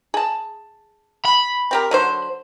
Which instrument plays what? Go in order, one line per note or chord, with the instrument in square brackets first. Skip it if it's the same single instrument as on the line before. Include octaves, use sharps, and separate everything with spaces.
[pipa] G#4 A5
[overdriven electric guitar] B5
[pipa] C4 G4 A#4
D3 F#3 C5